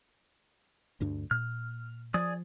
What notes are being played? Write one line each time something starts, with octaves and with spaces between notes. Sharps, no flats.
D2 G2 D4
A#2 F6
F3 G#4 D5 D#6